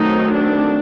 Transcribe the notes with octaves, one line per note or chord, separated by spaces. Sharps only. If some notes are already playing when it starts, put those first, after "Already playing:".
Already playing: D#3 F#3 A3 C4 D#4
D4